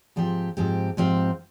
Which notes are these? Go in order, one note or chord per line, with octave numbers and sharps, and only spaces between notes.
G#2 F3 C4 G4
G#2 F3 C4 G4
G#2 F3 C4 G4